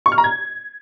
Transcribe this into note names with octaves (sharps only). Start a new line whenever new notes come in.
C#6
F6
A#5
G#6